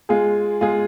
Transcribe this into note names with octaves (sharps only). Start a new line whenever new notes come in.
G#3 F4 G#4
G#3 F4 G#4